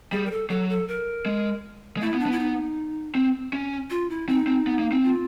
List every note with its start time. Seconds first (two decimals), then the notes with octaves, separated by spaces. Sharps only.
0.12 G3 G#4
0.25 A#4
0.31 A4
0.50 F#3 A4
0.69 A4
0.88 A#4
1.26 G#3
1.97 G#3
2.02 A3 E4
2.14 B3
2.20 D4
2.26 B3
2.32 E4
2.39 D#4
3.15 C4
3.53 C#4
3.90 F4
4.10 E4
4.29 C4 D#4
4.47 C4
4.67 B3
4.79 A#3
4.92 C4
5.04 F4